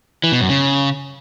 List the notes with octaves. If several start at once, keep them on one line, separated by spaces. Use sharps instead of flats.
E3
B2
F#2
C#3